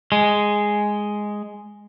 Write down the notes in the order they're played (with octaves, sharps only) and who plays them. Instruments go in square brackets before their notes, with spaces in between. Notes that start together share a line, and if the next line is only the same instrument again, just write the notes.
[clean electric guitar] G#3